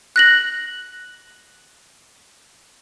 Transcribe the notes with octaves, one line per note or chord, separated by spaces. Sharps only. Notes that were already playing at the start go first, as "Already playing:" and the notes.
F#6 A#6 F#7